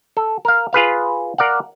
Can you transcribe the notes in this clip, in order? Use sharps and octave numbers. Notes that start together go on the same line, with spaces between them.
A4
A#4 F5
F4 G#4 B4 F5
A#4 D5 F5 F#5